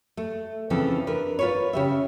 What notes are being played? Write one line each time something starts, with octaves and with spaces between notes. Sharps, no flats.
A3
C#3 E3 F3 C4 A4
D4 A#4 B4
F4 B4 C#5
C#3 G4 E5